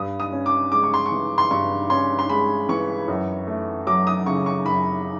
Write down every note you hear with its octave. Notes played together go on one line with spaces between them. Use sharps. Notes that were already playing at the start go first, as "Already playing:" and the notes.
Already playing: G2 D#6
D#6
C#4
D6
G#3 D6
C#6
C6
C#6
E3
C6
G2 C#6
C#4 C6
C6
G#3 B5
E3 C#6
F#2
A3
F#3 D6
D#6
C#3 C#6
C#6
F#2 B5